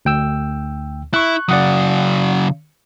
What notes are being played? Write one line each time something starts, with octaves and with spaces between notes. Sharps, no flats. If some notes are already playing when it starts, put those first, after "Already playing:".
D2 G5 E6
E4 C#6 F#6
C#3 F#3 D5 F#5 D#6